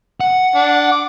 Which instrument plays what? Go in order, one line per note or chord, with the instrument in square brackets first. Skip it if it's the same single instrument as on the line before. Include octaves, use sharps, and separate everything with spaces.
[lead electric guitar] F#5
[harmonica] D4
D6